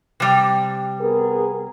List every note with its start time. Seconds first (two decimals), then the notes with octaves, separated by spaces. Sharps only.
0.20 C3 G3
1.00 B3 G#4 A#4